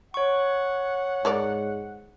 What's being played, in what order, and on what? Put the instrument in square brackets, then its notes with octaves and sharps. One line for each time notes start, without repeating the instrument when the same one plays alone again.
[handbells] C#5 C#6 [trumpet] F#5
[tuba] G#2 [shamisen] G#4 A#4 D5